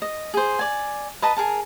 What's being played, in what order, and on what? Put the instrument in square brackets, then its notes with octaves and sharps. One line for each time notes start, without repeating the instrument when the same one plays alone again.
[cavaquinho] D#5
G#4 C5
D5 G#5
B4 D#5 A5 A#5
G#4 A#4 A5